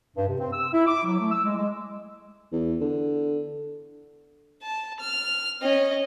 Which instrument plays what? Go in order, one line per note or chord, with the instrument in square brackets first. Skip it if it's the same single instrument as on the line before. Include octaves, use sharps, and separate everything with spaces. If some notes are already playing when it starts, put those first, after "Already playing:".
[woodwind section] G2
C3
C4
E6
E4
D6
F#3
A3
E6
G#3
G#3
[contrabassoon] E2
D3
[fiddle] A5
F6
C#4 D#5